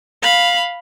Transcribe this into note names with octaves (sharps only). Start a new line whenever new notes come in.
F5 B5